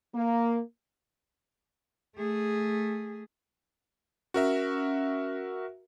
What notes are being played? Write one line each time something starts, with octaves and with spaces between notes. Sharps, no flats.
A#3
A3 G#4
C#4 F#4 A#4 E5